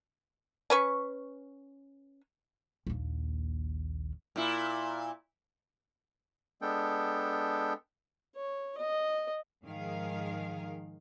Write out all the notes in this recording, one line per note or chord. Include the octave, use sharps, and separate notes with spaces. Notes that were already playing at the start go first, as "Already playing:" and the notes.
C#4 B4 C#6
A#1 D#2
A#2 E4
G#3 B3 D4 A4 G5
C#5
D#5
G#2 D#3 F3 G#4 A#4 F5